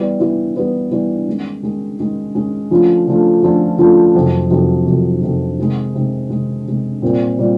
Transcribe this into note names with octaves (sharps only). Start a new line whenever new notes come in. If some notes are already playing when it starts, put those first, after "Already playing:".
Already playing: E3 G3 B3 E4 G4
E3 G3 B3 E4 G4
E3 G3 B3 E4 G4
E3 G3 B3 E4 G4
D#3 G#3 C#4
D#3 G#3 C#4
D#3 G#3 C#4
D#3 G#3 C#4
D3 F3 A3 C#4 F4
D3 F3 A3 C#4 F4
D3 F3 A3 C#4 F4
D3 F3 A3 C#4 F4
F2 C3 D#3 F#3
F2 C3 D#3 F#3
F2 C3 D#3 F#3
F2 C3 D#3 F#3
C3 D#3 G#3
C3 D#3 G#3
C3 D#3 G#3
C3 D#3 G#3
A#2 G3 C4 F4 A#4
A#2 G3 C4 F4